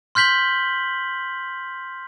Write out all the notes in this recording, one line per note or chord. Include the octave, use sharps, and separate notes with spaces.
C6 F6 G6 B6 F#7 G7